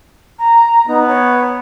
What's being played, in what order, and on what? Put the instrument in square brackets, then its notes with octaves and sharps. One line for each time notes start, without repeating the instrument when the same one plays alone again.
[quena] A#5
[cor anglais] B3 [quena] D#4
[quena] C#5